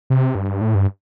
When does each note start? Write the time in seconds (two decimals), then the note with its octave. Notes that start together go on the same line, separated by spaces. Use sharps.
0.10 C3
0.35 G2
0.61 A2
0.75 G2